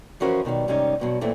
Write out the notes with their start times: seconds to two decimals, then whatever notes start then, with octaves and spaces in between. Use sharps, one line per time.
0.20 E3 F3 C#4 F#4 A#4 C5
0.45 B2 D#3 F#3 G3
0.68 G#2 C3 D#3 G3 C#4 D#4
1.00 G2 B2 F#3
1.21 F#2 A#2 E3 A3 C4